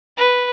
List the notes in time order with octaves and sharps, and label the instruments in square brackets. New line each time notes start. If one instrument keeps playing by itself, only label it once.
[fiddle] B4